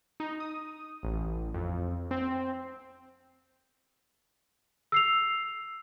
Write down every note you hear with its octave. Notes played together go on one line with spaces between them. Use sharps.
D#4
D#6
A1
F2
C4
E6 C7 F7